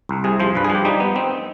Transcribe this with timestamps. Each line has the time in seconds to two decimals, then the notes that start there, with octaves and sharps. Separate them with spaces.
0.09 C2
0.24 C3 G#4
0.40 F3 C5
0.55 G2 B4
0.64 G#4
0.70 F3
0.75 G4
0.85 G3 D#4
1.00 B3
1.16 C4